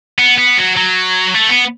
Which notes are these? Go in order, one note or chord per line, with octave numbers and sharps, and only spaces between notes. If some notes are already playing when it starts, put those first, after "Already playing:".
B3
B3
F#3
F#3
A3
B3